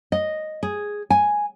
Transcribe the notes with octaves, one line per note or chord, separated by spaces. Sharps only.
D#5
G#4
G#5